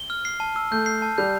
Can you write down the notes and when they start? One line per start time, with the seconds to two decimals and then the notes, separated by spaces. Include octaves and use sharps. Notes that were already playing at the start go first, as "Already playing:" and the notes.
Already playing: G7
0.10 F6
0.25 C7
0.40 A5
0.56 E6
0.71 A3 G6
0.86 C7
1.02 A5
1.18 G3 G6